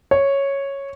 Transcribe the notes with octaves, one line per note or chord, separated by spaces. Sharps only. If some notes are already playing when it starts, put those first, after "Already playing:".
C#5